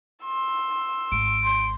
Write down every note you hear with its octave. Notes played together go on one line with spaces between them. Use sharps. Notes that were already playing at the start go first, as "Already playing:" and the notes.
C6 E6
G#1 D7
C6